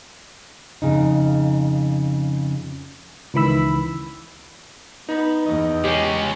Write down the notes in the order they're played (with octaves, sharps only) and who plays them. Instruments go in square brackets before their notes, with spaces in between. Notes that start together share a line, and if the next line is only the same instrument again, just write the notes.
[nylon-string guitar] F2 C#3 D#4
[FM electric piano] C#2 D#3 E3 B5 E6
[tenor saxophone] B3 [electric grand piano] D#4
[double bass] E2 [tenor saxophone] D#5
[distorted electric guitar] G#3 C#4 [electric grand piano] G4